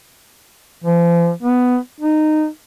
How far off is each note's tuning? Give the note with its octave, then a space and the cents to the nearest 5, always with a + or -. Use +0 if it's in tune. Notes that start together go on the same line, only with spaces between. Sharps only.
F3 -40
B3 +10
D#4 -15